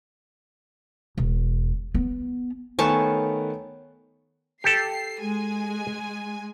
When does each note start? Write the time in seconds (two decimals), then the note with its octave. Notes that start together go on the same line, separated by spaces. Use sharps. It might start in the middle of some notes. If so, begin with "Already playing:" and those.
1.17 E1
1.94 B3
2.79 D#3 A3 B3 C#5 G#5 A5
4.64 G4 A4 C7
5.21 G#3 G#5